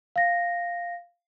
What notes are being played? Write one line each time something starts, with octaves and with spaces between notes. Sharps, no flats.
F5 A#6